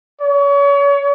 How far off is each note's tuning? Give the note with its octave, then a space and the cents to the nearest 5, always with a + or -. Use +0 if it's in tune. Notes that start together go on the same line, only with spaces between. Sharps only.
C#5 +35